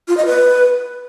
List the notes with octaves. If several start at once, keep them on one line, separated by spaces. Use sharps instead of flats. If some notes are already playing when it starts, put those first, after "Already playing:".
F4
D#5
B4